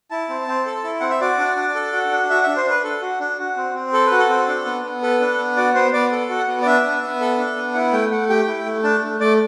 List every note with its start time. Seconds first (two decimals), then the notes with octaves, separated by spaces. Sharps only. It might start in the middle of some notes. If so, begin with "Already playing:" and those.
0.11 E4 A5
0.30 C4
0.48 C4
0.66 A4
0.84 E4
1.00 C4 F#5
1.10 E5
1.21 F#4 D5
1.39 D4
1.56 D4
1.75 A4
1.93 F#4
2.11 D4
2.30 F#4 E5
2.43 D4 E5
2.57 C5
2.65 D4 B4
2.84 A4
3.02 F#4
3.20 D4
3.38 F#4
3.57 C4
3.74 C4
3.93 A4
4.06 B4
4.11 F#4
4.19 A4
4.29 C4
4.48 D4
4.65 B3
4.84 B3
5.03 A4 B4
5.20 D4
5.38 B3
5.56 F#4 D5
5.75 B3 C5
5.93 B3 D5
6.12 A4
6.29 F#4
6.38 F#5
6.48 B3
6.62 D5
6.66 D4 E5
6.83 B3
7.02 B3
7.21 A4
7.38 D4
7.56 B3
7.74 E4 F#5
7.93 A3 G5
8.11 A3 F#5
8.29 G4 G5
8.47 E4
8.66 A3
8.84 D4 A5
9.02 A3
9.20 A3 D5